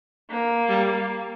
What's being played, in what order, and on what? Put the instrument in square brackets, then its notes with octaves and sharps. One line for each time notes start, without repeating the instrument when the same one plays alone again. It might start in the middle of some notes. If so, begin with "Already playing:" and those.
[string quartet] A#3
[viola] G3